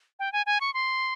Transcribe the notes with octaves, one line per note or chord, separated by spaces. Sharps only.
G5
G#5
G#5
C#6
C6